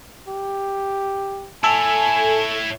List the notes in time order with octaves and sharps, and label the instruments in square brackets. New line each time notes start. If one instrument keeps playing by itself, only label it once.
[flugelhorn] G4
[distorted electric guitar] E4 C#5 [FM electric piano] A4 [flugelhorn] G#5